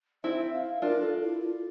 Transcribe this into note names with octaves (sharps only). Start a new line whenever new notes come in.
C4 E4 E5
F5
D4 F4 A#4
A4
E4
F4